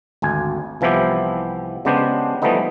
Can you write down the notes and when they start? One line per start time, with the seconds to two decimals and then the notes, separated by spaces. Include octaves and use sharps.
0.22 G#1 D2 G#5
0.81 C2 E3 F3 B3 E4 G4
1.85 C#3 G#3 B3 D4 G4 C5
2.42 E3 F3 G3 A3 B3 D#4